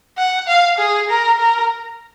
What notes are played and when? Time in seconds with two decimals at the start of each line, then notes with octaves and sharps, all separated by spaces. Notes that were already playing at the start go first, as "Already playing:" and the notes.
0.18 F#5
0.47 F5
0.78 G#4
1.09 A#4
1.39 A#4